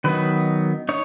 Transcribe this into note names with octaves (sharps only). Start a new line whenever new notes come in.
D#3 F#3 B3 D#4 B4
D#4 C#5